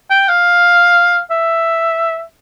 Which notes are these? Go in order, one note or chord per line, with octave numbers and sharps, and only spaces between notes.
G5
F5
E5